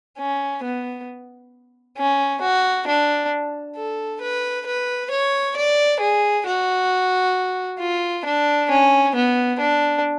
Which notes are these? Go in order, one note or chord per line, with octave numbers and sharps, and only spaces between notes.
C#4
B3
C#4
F#4
D4
A4
B4
B4
C#5
D5
G#4
F#4
F4
D4
C#4
B3
D4